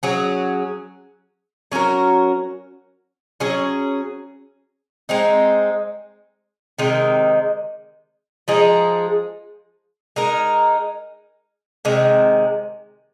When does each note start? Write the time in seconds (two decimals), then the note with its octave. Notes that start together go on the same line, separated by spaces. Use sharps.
0.03 F#3 C#4 G#4
1.72 F#3 C#4 F#4 A#4
3.40 F#3 C#4 G#4
5.09 G#3 C4 D#4
6.79 C3 D#3 G#3
8.48 F3 G#3 D#4 G#4
10.16 G#3 D#4 A#4
11.85 C3 D#3 G#3